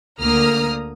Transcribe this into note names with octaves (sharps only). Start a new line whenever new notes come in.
D2 D3 A#3 A#5 D#6 F6